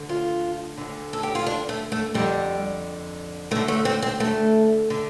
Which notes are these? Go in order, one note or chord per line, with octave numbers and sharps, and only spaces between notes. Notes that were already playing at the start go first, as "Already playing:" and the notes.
Already playing: D2 D3
F4
D2 D3
A4
G4
F4
D4
A3
A3
F2 D3 G3
D2 D3 A3
A3
C4
C4
A3
D3